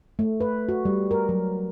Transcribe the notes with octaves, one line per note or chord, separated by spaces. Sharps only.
A3
B4
F#4
G3
A#4
F#3